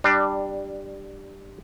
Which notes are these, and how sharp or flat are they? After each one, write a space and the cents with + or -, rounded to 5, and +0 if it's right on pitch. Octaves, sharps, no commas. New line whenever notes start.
G3 +0 D4 +15